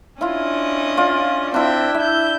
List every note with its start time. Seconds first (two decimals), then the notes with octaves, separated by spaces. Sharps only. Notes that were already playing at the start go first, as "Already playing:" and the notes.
0.21 C#4 D4 E4 F4 D#5
0.97 F4 D5
1.54 C4 D4 E4 E5 G5
1.94 E4 E5 G6